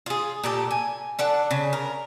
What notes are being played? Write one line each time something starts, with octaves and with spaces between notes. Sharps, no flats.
F4 G#4
A#2 G4 A4
G#5
D4 A4 F#5
C#3
A#4